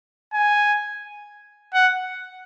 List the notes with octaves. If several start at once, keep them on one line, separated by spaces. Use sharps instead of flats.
G#5
F#5